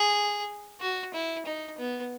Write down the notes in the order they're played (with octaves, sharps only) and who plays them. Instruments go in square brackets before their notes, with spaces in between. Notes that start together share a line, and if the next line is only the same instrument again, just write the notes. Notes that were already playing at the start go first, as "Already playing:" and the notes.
Already playing: [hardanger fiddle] G#4
F#4
E4
D#4
B3